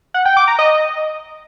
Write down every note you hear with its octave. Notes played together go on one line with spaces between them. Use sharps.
F#5
G5
D6
A#5
D#5